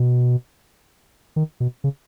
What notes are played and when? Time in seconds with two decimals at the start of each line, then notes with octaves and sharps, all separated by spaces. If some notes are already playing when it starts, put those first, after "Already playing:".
Already playing: B2
1.36 D#3
1.60 B2
1.84 C#3